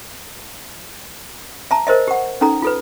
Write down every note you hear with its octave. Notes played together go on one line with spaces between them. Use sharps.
E5 A5 A#5
A#4 C5 D#5 E5
G4 F#5
C#4 D#4 A4 A#5
F4 A4 B4